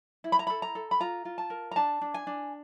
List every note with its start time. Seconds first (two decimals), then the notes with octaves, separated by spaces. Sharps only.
0.24 E4
0.32 B5
0.39 A#5
0.47 A4 B5
0.62 A#5
0.75 A4
0.91 B5
1.00 F4 A#5
1.25 F4
1.38 A5
1.50 A#4
1.71 A#5
1.76 D4 A5
2.01 D4
2.14 G#5
2.27 D4